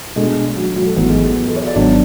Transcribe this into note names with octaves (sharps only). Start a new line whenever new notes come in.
B2 G#3 A3 D4
F#3
F#3
A3
G#1 G#2 E3 F#3 B3
G#3
A3
B3
A4
C#5
D5
G#1 G#2 F#3 B3 D4 C#5